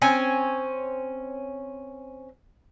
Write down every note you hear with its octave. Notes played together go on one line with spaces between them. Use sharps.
C4 C#4 G#5